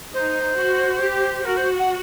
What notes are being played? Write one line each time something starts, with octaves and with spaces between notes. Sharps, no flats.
D#4 C5
F#4
G4
F#4 A#4
C5
F#5